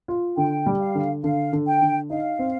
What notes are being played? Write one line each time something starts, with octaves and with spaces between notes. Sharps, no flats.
F4
D3 G5
G3
F5
D3
D3 F5
D3
G5
D3
D#4 F5
C4